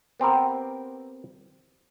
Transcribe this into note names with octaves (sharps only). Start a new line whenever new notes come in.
B3 C4 G4 A#4